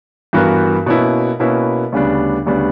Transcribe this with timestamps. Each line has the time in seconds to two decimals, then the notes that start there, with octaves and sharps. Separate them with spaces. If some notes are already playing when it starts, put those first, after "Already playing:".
0.33 G2 E3 B3 F#4 A#4
0.86 B2 A#3 C#4 E4 B4
1.40 B2 A#3 C#4 E4 B4
1.92 D2 C#3 G3 B3 D4
2.46 D2 C#3 G3 B3 D4